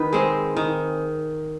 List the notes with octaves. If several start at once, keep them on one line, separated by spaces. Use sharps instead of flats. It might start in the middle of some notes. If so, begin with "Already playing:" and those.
Already playing: D#3 B4
G#3 C4
D#3